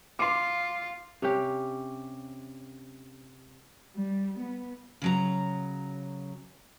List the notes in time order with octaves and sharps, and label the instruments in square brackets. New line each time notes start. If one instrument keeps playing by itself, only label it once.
[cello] F4 [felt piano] C6 D6
[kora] C3 C#4 G4
[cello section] G3
B3
[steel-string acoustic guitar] C#3 F#3 A#5